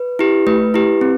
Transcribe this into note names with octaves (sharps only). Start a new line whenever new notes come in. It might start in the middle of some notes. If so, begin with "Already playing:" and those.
Already playing: B4
E4 G4
A3 B4
E4 G4
C4